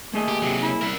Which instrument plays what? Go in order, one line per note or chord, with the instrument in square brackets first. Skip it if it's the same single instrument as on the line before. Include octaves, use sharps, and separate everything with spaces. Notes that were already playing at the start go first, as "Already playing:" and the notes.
[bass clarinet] A3 [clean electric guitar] A#3 G#4 D#5
[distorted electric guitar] G4
[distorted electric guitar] C3 F#3 [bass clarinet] G4
[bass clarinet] E4
[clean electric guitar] C2 [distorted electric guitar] A#4 E5